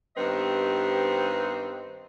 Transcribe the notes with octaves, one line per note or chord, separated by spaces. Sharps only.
G2 D#3 B3 C4 G4 D#5